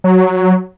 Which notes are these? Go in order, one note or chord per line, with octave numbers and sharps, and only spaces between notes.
F#3